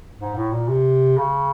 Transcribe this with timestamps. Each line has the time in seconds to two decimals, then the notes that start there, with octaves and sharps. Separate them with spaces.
0.19 G#2
0.35 A2
0.52 A#2
0.68 C3
1.17 C#3